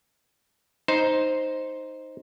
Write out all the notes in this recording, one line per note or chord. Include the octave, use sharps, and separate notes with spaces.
D#4 C5